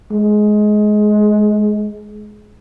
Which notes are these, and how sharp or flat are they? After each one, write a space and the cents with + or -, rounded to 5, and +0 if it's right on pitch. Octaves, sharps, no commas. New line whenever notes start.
G#3 +20